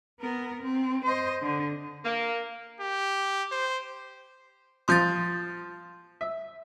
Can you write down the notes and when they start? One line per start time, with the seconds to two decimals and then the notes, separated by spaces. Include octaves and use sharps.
0.20 B3 A#4
0.62 C4
1.05 C5 D#5
1.42 D3
2.04 A#3
2.80 G4
3.51 C5
4.88 F3 C6 D#6 G6 A6
6.21 E5